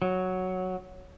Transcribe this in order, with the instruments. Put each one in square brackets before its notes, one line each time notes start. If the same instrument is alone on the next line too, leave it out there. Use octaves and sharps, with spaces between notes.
[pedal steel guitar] F#3